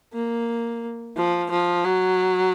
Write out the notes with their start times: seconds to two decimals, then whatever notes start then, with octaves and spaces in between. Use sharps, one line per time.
0.14 A#3
1.17 F3
1.51 F3
1.85 F#3